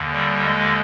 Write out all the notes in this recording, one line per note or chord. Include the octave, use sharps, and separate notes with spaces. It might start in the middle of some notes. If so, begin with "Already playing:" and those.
Already playing: D#2 D3
G3
G#3